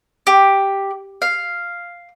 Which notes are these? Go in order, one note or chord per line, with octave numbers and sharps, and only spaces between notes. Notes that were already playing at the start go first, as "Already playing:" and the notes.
G4
F5